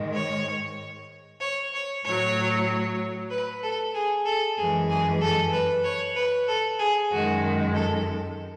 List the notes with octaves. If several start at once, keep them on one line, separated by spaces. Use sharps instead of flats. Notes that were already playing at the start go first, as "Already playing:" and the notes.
Already playing: G#2 D#3 G#3
C#5
C#5
C#5
A2 F#3 C#5
B4
A4
G#4
A4
F#2 E3 G#3 G#4
G#4
A4
B4
C#5
B4
A4
G#4
F#2 D#3 G#3 F#4
A4